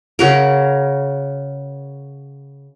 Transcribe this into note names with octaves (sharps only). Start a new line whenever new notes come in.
C#3 F#4 A#4